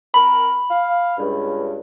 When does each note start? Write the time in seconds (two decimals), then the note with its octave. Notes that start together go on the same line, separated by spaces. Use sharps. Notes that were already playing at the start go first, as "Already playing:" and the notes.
0.14 C4 A#4 A5 B5
0.69 F5
1.18 C#2 G2